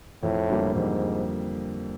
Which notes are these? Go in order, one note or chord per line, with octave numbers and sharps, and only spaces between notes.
F2 A2
D3 G3 A#3
F2 G#2